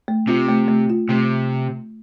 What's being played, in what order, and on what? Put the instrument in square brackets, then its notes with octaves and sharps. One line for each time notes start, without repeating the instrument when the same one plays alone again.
[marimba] A3
[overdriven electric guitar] C3 [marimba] F4
[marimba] A3
A3
F4
[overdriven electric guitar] C3 [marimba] A3